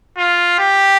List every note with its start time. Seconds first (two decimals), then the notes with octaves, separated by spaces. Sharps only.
0.18 F4
0.59 G4